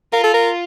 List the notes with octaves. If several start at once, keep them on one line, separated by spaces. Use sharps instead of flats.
F4 A#4
A4
A#4